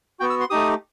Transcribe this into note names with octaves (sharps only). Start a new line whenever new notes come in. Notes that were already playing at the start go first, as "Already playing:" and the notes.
B3 F#4 G5
E6
C6
A3 D#4 G4 D#6